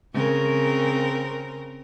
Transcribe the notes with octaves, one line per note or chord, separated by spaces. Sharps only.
C#3 C4 A#4